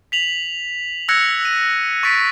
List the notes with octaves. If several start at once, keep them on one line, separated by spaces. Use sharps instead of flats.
B6 F7 F#7
E6 F#6 G#6 A#6 C#7
D#7
C#6 A6 B6 D7